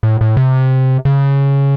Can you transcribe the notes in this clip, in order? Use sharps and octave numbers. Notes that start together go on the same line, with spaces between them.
A2
A2
C3
C#3